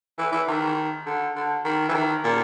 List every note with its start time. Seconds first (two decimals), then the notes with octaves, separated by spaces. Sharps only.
0.18 E3
0.32 E3
0.48 D#3
1.06 D3
1.36 D3
1.64 D#3
1.89 E3
1.94 D#3
2.24 A#2